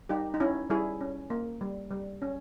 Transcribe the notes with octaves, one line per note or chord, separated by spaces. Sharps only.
G3 D#4 G4
D#4
C#4 E4
G3 E4 G#4
C#4
A#3
G3
G3
C#4